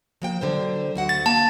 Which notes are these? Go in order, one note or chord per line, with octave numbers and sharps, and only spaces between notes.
F3 A#3 G5
D3 F#3 C5
D2 F#4 F#5
A6
A#3 A5